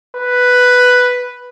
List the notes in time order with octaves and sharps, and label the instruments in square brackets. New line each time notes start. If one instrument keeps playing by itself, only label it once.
[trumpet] B4